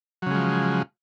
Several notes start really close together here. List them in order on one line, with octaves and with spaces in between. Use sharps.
F#3 C#3 G#3 F3